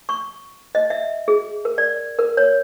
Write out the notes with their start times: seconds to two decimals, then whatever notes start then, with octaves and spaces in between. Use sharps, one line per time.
0.09 C#6
0.75 D#5
0.90 E5
1.28 G#4
1.65 A#4
1.78 D5
2.19 A#4
2.37 C#5